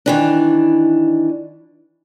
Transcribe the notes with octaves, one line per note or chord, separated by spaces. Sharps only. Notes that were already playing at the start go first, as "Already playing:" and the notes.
D#3 E3 D4